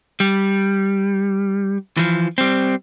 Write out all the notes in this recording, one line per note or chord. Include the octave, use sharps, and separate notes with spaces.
G3
E3 F3
G3 C4